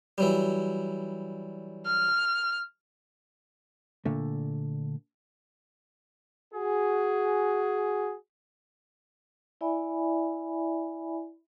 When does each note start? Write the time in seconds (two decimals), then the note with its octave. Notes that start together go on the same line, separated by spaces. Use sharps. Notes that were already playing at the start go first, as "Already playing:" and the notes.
0.18 E3 F#3 G3
1.86 F6
4.05 A#2 D3 A3
6.53 F#4 G#4
9.61 E4 D5 E5 G#5 B5